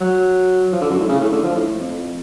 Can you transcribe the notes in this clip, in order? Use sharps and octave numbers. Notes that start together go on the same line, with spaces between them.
F#3
F3
D3
F#2
A2
C#3
A2
D3
F3
A2
F2